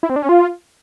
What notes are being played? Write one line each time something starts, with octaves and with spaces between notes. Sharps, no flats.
E4
C4
D4
C#4
F4